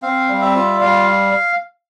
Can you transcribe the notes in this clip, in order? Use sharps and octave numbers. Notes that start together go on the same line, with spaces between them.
C4 F5
G3
E5
F4
G3 F5